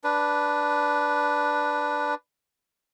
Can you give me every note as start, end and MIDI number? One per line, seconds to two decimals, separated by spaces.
0.04 2.15 62
0.04 2.15 71